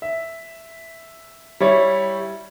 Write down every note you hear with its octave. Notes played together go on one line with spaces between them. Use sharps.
E5
G3 E4 C#5